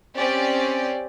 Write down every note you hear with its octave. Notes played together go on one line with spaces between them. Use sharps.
C4 C#4 G4 D5